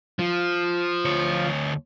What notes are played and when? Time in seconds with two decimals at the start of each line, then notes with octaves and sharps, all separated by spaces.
0.19 F3
1.05 D2 C#5